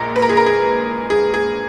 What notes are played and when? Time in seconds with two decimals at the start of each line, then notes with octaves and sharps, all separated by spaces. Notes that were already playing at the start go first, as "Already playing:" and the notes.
Already playing: A#1 A#2 G#3 A#4
0.16 B4
0.22 A#4
0.29 G#4
0.37 A#4
0.46 G#4
1.10 G#4
1.34 G#4